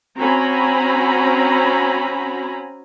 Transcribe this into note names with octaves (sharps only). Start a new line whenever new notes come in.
C4 C#4 F#4 G#5 A#5 B5